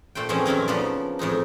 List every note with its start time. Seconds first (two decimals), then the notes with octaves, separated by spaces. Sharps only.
0.15 A#2 A3 C5 G5
0.29 E3 F3 G#3 A#3 C4 C#4
0.46 F#2 A#2 D#3 C#4 A#4
0.68 C#3 F3 A#3 B3 D4
1.19 F2 A2 G#3 D#4